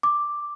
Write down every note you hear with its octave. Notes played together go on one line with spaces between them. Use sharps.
D6